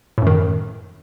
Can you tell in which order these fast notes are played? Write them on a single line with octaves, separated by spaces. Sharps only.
A2 F#2 D#3